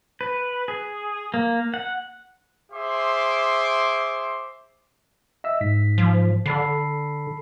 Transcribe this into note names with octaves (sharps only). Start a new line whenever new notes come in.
B4
G#4
A#3
F#5
G#4 C5 E5 C6 D6
D#5 E5 E6
G#2 B6
F3
D3 A4 B5 C7